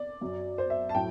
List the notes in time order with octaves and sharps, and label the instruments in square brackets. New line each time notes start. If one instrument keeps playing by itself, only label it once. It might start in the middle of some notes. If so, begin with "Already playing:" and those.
Already playing: [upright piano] D5
F#2 F#3
C5
E5
A5
A2 F#3 G5